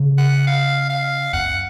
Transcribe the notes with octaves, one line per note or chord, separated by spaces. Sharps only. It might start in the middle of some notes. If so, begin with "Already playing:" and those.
Already playing: C#3
F#5
F5
F5
F#2 F#5